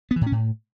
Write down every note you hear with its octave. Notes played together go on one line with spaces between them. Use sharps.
B3
E3
A2
C#4
A2